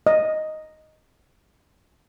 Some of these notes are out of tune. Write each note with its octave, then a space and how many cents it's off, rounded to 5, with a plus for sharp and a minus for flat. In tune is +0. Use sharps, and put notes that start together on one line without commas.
D#5 +0